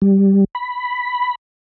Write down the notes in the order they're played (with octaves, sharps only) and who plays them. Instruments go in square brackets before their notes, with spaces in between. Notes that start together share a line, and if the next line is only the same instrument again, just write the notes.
[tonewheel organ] G3
B5